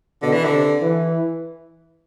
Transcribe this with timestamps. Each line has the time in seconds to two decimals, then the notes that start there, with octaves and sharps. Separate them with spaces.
0.22 B2 D3
0.33 E3
0.44 D3
0.52 C3
0.82 E3